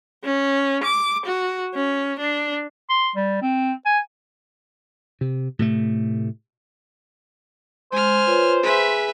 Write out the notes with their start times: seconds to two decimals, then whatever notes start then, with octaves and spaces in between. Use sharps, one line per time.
0.24 C#4
0.84 D6
1.26 F#4
1.75 C#4
2.19 D4
2.90 C6
3.16 G3
3.42 C4
3.86 G#5
5.21 C3
5.59 A2 C3 A3
7.92 G#3 C5 G#5 F6
8.27 F4 B4 C#5
8.63 G#4 B4 E5 G#5